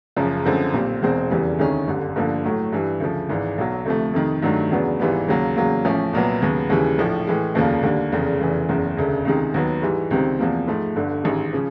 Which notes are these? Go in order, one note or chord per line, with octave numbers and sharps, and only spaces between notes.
F#1 F#2 C#3 F3
F#2 D3 F3 G#3 C4
B1 A#2 G3 C4
E1 E2 B2 G#3 C4
F1 E2 C#3 E3 G3
D2 C3 D#3 G#3 C#4
G1 F#2 D3 G3
G1 G2 D3 F3 A#3
A2 F#3 A3
G2 E3 G3
D2 C#3 F3
G#1 G#2 E3
B1 B2 F#3
D2 C3 F3 A3
F2 C3 D#3
G2 D#3 F#3 A3
E2 C#3 F#3 B3 D4
G#1 G#2 E3 G3 B3
D#2 C#3 F#3 A#3
E2 C#3 F#3 A#3
A1 A2 F3 A3 C#4
C2 A#2 F#3 B3
D#2 C#3 F#3 B3
D#2 C#3 E3 G3
A#1 A2 F3
A2 E3 G#3
F1 D#2 C#3 F3 A#3
D#2 D3 G3 A#3 D4
F1 E2 C#3
F1 E2 C#3 E3
F#1 E2 C#3
E1 D2 C#3
C#2 C3 D#3 G#3
D#2 D#3 F#3 B3
G#2 E3 G3
C#2 C3 D#3 G3 C4
E2 C3 F3 A#3
G#2 F3 A3
G1 G2 D3
A1 G#2 D#3 G3
C#3 F3